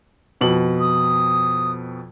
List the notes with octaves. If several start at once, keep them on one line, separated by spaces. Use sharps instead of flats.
F2 B2 F#7
D#6